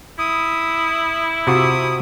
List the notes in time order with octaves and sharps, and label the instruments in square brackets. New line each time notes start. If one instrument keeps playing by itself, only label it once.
[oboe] E4 [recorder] D#6
[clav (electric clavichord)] C3 F4 F#4 [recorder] D#6